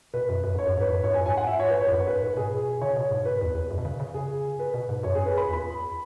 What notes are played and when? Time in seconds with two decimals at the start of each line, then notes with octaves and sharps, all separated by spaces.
0.14 B2 B4
0.29 F#2
0.44 F#2
0.55 G#2 C#5
0.66 F#2
0.78 G#2 B4
0.89 F#2
1.04 G#2 C#5
1.14 F#2 G#5
1.26 G#2 G#5
1.37 F#5
1.47 E5
1.60 C#5
1.70 B4
1.81 C#5
1.87 G#2
1.92 F#2 B4
2.07 G#2 B4
2.22 G#2 B4
2.37 B2 G#4
2.81 C#3 C#5
2.96 B2
3.11 G#2
3.25 B4
3.41 E2
3.55 E2
3.71 F#2
3.78 B2
3.85 C#3
4.00 C#3
4.14 G#4
4.59 B4
4.74 B2
4.89 G#2
5.03 F#2 C#5
5.15 G#4
5.26 B4
5.38 B5
5.49 E2 B5